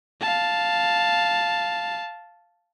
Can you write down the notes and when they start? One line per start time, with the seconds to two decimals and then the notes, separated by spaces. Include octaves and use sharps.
0.21 F5 A5